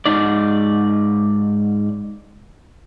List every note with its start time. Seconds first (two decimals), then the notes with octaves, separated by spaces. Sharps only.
0.06 G#2 D#4 D5